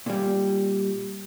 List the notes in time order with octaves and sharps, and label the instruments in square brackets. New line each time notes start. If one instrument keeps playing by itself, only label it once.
[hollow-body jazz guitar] A#2 G3